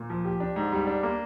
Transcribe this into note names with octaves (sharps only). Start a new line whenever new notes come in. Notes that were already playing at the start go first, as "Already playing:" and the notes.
Already playing: A#2
F3
G4
D4
G#2
G3
D4
A#3